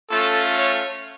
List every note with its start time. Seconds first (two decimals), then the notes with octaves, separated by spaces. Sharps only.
0.10 A3 C#4 F4 A4
0.57 C#5